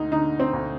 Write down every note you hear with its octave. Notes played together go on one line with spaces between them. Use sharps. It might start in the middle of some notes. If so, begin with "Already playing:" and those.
Already playing: D2 D#4
D3 D#4
C4
D2